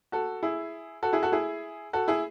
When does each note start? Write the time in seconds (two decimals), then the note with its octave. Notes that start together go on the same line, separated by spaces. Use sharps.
0.12 F#4 A4
0.43 E4 G#4
1.03 F#4 A4
1.13 E4 G#4
1.23 F#4 A4
1.32 E4 G#4
1.93 F#4 A4
2.08 E4 G#4